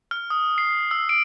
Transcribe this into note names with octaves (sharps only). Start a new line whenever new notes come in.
F6
D#6
C7
E6
D7